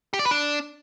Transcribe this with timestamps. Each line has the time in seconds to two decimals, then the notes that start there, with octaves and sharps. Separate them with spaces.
0.13 G4
0.19 D5
0.25 B4
0.31 D4